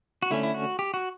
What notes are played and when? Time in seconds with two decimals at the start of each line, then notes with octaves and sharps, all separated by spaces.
0.23 F#4
0.31 D3 A3 C#4 E4
0.43 E4
0.54 F#4
0.79 G4
0.94 F#4